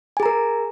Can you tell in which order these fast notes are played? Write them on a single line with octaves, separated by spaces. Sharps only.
G#5 G#4 A#5 A#4